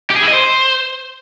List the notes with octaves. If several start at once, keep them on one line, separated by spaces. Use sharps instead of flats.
G4
G#4
E4
D#5
C5